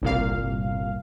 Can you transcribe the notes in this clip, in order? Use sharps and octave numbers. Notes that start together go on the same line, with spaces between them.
G1 C2 A#2 F5